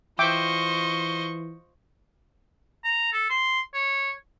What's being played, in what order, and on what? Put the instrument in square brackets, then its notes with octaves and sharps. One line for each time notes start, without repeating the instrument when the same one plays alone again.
[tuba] E3 [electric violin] F4 C#6 [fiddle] C5 D#5 [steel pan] E5 G5 D6
[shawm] A#5
A4
C6
C#5